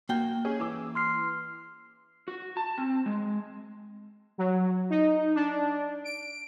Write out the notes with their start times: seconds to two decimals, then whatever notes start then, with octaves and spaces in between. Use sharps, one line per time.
0.09 A#3 F#4 G5
0.45 C#4 G#4
0.60 E3 D6 E6
0.95 C6 F6 C7
2.28 F#4
2.57 A5
2.78 C4
3.06 G#3
4.38 F#3
4.90 D#4
5.35 D4
6.04 D7